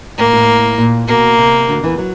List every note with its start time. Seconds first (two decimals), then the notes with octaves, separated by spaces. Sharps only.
0.18 A2 A#3
0.33 A2
0.78 A#2
1.08 B2 A#3
1.38 C3
1.68 D2 D3
1.83 E2 E3
1.98 F#3